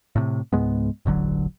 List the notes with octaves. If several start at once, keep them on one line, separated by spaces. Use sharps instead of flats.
A2 C3
C#2 G#2 G#3 B3
E1 A1 D3 F#3